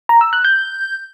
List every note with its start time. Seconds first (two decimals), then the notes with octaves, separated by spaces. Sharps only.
0.09 A#5
0.21 E6
0.33 F#6
0.45 G6